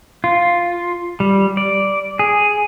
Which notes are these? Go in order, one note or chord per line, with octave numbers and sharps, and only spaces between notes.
F4
G3
D5
G#4